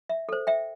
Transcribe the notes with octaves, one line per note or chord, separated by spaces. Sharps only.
E5
A4 C5
E5 G5